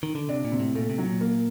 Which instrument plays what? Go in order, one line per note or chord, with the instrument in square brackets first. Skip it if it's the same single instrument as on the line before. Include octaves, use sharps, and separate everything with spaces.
[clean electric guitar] D#3
D3
[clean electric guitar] C3 [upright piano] D4
[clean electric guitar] A#2
[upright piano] C3
[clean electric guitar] A2
[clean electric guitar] A#2 [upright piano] A3
[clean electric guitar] C3
[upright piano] F#3
[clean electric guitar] A#2
[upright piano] A#3